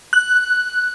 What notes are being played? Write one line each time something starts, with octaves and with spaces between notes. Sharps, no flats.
F#6